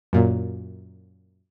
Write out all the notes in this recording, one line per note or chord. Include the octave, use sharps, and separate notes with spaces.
F#2 A#2